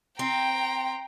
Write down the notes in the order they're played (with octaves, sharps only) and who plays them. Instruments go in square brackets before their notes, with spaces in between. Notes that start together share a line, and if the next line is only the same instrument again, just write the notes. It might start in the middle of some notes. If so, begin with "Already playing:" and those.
[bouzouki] C4 [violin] G5 A#5